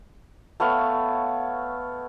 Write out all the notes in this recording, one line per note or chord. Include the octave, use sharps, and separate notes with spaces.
A3 B3 C#5 F5